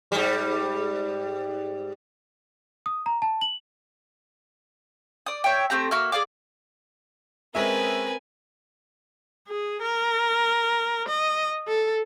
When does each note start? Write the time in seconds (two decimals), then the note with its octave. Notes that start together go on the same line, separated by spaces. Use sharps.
0.12 G#2 G3
2.86 D#6
3.06 A#5
3.22 A5
3.41 F#7
5.26 D5 D#6
5.44 C#5 E5 G5
5.70 A3 C4 G4 A#5
5.91 A#3 F#4 E5 F6
6.12 G#4 D5 F5 D6
7.55 G#3 C4 C#4 A#4 B4 E5 G#5
9.48 G#4
9.81 A#4
11.08 D#5
11.68 A4